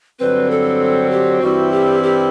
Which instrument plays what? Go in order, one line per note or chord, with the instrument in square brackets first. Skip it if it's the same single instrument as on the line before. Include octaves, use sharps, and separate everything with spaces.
[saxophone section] G2 D3 F#3 C4 [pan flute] B4
[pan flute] A4
G4
[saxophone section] G2 E3 G3 C4 E4 [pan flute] F#4
[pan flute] G4
G4